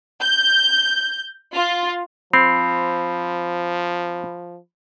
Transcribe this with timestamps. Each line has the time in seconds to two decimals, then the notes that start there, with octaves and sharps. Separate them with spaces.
0.20 G6
1.54 F4
2.33 F3 C4 B5